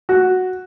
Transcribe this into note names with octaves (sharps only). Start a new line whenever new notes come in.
F#4